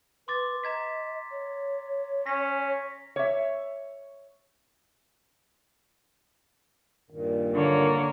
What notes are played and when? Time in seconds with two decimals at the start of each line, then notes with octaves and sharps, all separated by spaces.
0.28 B4 C6 D6 A6
0.64 D#5 A#5 G#6 B6
1.31 C#5
2.26 C#4 A#6 B6
3.16 C#5 E5
7.10 G2 A#2 D#3
7.54 D3 A#3 C#5